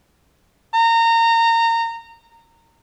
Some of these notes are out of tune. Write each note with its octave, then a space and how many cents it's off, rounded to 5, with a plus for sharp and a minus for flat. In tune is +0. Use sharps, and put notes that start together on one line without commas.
A#5 -25